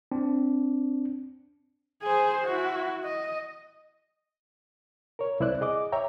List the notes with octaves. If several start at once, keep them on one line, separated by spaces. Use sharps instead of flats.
C4 D4
G#4 C5
E4 F#4
D#5
A#4 C#5
C2 E4 C5 D5 F#6
G#4 D#5 D6
C#5 E5 G5 A#5